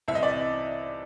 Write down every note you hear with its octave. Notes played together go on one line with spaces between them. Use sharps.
C2 C3 E3 E5
D#5
D5
D#5